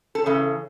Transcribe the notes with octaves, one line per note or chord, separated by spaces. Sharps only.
A4
C#3 E3